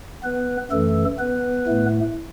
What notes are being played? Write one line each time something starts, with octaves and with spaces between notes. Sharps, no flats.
B3 B4
F#2 E3 A3 A4
B3 B4
A2 A3